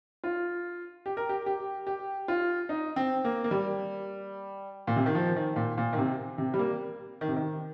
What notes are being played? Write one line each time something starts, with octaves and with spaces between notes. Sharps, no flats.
F4
G4
A#4
G4
G4
G4
F4
D#4
C4
A#3
A#3
G3
A#2
C3
D#3
F3
D#3
A#2
A#2
D#3
C3
C3
G3
A#3
D#3
C3
D#3